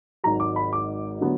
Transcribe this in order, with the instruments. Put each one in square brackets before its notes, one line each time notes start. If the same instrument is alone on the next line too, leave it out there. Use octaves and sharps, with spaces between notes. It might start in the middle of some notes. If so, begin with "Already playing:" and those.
[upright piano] G#1 G#2 F#3 A#5
D6
B5
D6
D3 F#3 B3